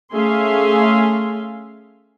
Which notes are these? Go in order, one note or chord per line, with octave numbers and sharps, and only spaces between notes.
A3 C#4 G#4 E5 F5 C6